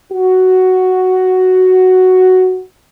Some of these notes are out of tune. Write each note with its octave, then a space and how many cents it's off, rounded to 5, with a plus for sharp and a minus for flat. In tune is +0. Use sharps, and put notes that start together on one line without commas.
F#4 +5